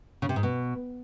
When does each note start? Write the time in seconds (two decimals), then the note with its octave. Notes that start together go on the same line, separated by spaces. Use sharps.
0.22 C#3
0.29 C3
0.36 G#2
0.43 B2